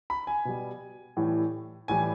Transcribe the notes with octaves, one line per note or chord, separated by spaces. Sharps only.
B5
G#5
B2 G3
A2 E3 G3
A2 E3 G3 G#5